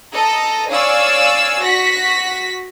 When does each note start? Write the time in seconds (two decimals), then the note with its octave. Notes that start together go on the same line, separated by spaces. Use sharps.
0.14 A4 D#5 A#5
0.70 C#5 D5 F5 G#5 E6
1.63 F#4 F#5 A#6 B6